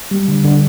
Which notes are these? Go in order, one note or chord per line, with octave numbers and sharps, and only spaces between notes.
G3
D3
D3